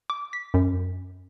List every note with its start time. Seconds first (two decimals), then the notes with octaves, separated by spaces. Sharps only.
0.10 D6
0.33 B6
0.54 F#2